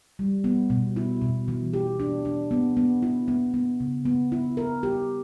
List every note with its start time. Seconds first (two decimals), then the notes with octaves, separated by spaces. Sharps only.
0.19 G3
0.44 B3
0.70 B2
0.96 E4
1.21 B2
1.48 E3
1.73 G4
2.00 D4
2.25 D4
2.51 B3
2.77 B3
3.03 E4
3.28 B3
3.54 B3
3.80 C#3
4.05 B3
4.32 E4
4.57 A#4
4.83 G4